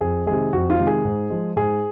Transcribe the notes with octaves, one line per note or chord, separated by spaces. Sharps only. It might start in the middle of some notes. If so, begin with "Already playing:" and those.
F2 G#4
C3 D#3 G#3 G#4
F2 F#4
F4
C3 D#3 G#3
G#4
G#2
F3 G#3
G#2 G#4